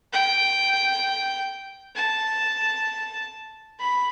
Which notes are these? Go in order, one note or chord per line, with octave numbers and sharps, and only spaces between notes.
G5
A5
B5